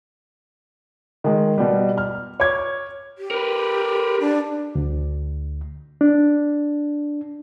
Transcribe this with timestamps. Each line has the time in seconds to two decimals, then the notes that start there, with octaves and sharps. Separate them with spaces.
1.24 D#3 G#3
1.58 B2 G3
1.98 F6
2.40 C#5 D6 G#6
3.18 G4
3.31 A#4 B4
4.20 D4
4.75 D2
6.01 D4